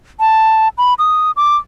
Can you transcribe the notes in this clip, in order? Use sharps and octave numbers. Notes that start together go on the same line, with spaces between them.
A5
B5
D#6
D6